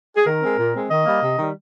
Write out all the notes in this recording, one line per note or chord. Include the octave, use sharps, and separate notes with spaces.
G#4
D#3 A#4
G#3 C4
A#2
G#3 C4
D#3 D#5
G3 A#3
C3
D#3 G3